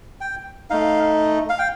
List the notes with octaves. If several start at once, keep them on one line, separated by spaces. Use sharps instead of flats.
G5
A3 D#4 F5
F5
G5